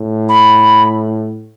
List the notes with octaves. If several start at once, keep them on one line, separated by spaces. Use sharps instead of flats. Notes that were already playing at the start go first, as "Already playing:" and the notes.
Already playing: A2
B5